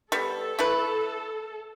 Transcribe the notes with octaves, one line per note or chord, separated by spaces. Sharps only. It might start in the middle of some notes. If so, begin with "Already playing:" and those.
G3 B3 A4
A3 E4 B4